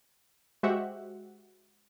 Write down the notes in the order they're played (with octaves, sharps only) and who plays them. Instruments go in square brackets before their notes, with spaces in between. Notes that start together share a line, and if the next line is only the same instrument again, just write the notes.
[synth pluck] G#3 F#4 G4 C5 E5 F#5